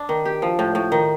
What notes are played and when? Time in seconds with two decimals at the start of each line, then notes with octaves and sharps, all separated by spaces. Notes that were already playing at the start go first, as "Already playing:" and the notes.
Already playing: D4
0.09 D#3
0.25 G4
0.42 F3
0.59 A2
0.75 A2
0.92 D#3